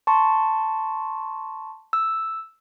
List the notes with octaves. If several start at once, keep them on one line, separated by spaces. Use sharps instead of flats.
A5 C6 C#6
E6